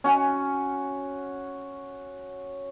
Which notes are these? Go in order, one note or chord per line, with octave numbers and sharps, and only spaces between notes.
C#4 F#4